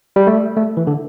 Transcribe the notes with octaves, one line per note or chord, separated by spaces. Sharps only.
G3
A3
A3
E3
D3